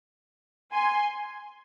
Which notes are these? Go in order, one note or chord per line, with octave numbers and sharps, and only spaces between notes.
G#5 C6